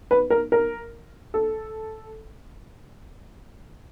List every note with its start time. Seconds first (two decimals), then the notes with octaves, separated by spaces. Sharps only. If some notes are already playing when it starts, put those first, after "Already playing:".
0.11 B4
0.30 A#4
0.52 A#4
1.34 A4